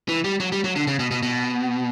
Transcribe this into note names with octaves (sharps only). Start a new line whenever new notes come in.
E3
G3
F#3
G3
F#3
D3
C#3
B2
B2
B2